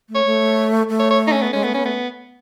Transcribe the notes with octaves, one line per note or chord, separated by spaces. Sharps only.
A3
C#5
A3
A3
C#5
C#5
D#4
C#4
B3
G#3 C#4
A3 B3
B3 C#4
A3 B3